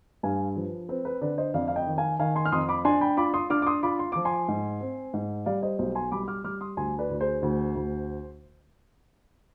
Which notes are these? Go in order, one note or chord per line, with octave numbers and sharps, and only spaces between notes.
G2 F5 G#5
F3 B4
C4 B4
B4
D3 B4 D5
C5 D#5
F2 D5 F5
F5
D#5 G5
D#3
F5 G#5
D#3 F5 G#5
G#5 C6
F6
F2 C6 D#6
B5 D6
D4 G#5 C6
G5 B5
F4 B5 D6
C6 D#6
D4 D6 F6
D6
C6 D#6
F4 B5 D6
C6
F3 D6
G#5 C6
G#2
C4
G#2
G3 D5 F5
C5 D#5
B1 C5 D#5
G#5 C6
G3 B5 D6
D6 F6
G3 D6 F6
C6 D#6
D2 G#5 C6
B4 D5
D2
G#4 C5
D2
D2